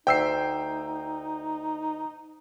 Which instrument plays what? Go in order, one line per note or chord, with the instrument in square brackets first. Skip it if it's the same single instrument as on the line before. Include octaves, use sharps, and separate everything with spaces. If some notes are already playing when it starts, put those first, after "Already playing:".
[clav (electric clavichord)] D2 [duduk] D#4 [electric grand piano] G5 E6 C7